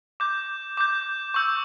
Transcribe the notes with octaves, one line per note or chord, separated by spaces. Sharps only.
D6 G6
D6 G6
C#6 E6 G6